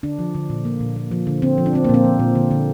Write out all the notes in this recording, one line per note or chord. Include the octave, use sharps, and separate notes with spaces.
D3 D4
F3
D3
A#2
A#3
A#2
A#3
F3
D3
D3 C4
F3
D4
D3 C4
A#3
A#2 C4
F3
A#2
D3
D3